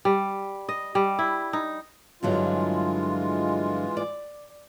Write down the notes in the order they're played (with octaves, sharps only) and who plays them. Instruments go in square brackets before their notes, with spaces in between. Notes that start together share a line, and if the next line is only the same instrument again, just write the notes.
[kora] G3
D#5
G3
E4
D#4
[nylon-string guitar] G2 D3 F#3 [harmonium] E3 G#3 F4
[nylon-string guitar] D5